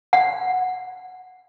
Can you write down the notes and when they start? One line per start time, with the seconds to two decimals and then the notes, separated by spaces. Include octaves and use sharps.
0.13 F#5